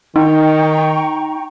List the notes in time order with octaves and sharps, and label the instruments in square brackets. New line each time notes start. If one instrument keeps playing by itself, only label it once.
[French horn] D#3 [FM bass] D#4 [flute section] G5 A#5 C#6